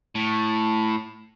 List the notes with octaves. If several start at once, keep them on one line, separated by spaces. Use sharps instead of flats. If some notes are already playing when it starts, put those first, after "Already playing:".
A2